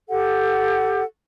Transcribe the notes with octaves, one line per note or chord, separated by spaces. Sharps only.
G4 A4 F#5